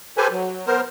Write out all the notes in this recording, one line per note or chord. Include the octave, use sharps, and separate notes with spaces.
G4 A4 B4 C5 G#5
F#3
B3 A#4 C5